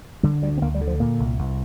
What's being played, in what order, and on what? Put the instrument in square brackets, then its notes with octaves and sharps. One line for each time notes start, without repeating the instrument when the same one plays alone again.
[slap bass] D3 G3
D2 G3
C4
D2 A#3
G3
D3
F3
A#2 A#3
C2
C2